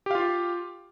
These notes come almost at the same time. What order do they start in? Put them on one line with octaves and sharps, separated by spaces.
G4 F5 F4